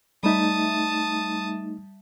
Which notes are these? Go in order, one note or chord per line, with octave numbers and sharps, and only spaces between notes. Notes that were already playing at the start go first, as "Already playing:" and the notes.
G3 A3 D#4 E5 A5 D#6